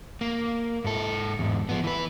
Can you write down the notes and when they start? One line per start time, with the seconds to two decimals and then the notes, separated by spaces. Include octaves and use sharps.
0.21 A#3
0.84 G#2 A4
1.39 E2 G#2
1.69 F3 B3
1.84 E3 B4